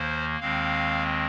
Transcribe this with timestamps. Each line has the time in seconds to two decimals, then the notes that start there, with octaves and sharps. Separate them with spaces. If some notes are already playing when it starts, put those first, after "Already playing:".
Already playing: D#2 D#3 A#3 C5
0.40 D#2 D#3 G#3 C4 F5